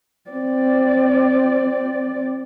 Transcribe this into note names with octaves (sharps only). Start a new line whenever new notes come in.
C4 D5